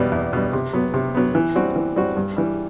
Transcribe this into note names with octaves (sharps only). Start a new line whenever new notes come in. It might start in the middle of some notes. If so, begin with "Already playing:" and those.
Already playing: E2 B2 G3
E2
B2 G3
C3
F#3 B3
C3
F#3 B3
E3
G3 C4 F#4
E3
G3 C4 F#4
G2
E3 G3